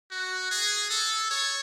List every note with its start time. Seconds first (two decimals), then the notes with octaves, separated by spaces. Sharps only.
0.11 F#4
0.51 G#4
0.90 A4
1.31 C#5